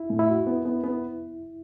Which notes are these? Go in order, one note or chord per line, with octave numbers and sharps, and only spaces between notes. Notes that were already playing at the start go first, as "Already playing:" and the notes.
Already playing: E4
A2
E4
F#4
B3
B3
B3